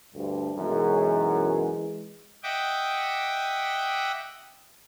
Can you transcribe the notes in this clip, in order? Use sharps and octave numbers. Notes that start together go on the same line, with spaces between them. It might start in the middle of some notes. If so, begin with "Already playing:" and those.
D2 G2
B1 F#2 E3 G#3
D#5 E5 F#5 G5 D6